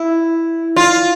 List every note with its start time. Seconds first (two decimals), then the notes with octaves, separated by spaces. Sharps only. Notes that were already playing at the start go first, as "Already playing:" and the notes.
Already playing: E4
0.76 F4